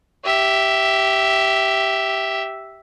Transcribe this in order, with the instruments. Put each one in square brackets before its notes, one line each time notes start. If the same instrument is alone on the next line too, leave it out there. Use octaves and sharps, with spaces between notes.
[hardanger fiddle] G4 E5